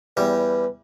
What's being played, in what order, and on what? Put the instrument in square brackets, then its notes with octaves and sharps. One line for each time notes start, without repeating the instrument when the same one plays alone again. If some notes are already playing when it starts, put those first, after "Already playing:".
[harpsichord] E2 G3 [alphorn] B4